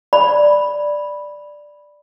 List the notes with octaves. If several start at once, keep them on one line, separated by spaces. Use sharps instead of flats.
D5 B5